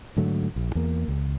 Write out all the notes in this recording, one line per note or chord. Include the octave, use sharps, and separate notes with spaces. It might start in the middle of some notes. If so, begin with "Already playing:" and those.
G#2 D3 F#3 A3
A#1
E2 A#3
C#2